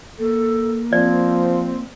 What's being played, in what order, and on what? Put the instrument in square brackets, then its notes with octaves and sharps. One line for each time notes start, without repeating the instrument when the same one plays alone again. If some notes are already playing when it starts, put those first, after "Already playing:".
[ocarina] A#3 [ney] A4
[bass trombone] F3 [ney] C4 [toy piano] D5